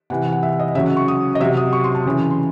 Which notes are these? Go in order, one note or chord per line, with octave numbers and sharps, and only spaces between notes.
C3 E3 F#5
F#5
E5
D#5
C#3 F#3 E5
F#5
C#6
D#6
D#5
C3 F#3 E5
D#6
C#6
C6
A5
C#3 E3
C6